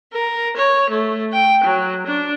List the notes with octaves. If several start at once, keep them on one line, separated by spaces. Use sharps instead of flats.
A#4
C#5
A3
G5
F#3
D4